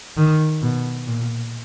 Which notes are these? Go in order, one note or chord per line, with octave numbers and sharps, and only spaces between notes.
D#3
B2
A#2